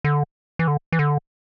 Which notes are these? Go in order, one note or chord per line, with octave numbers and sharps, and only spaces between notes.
D3
E3
D3
E3
D3